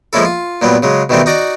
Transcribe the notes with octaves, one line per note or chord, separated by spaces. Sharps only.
F3 G#3 A#3 C#4 E4 A4
F4
A#2 F#3 G3 B3
C#3 F#3 G#3
B2 D#3 E3 G3 A3 C4
D#4 F#4 D5 D#5